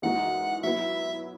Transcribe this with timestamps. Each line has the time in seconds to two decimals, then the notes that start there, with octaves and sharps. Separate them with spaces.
0.02 F#2 E3 G#3 D#4 F#4 F#5
0.63 F#3 B3 E4 E5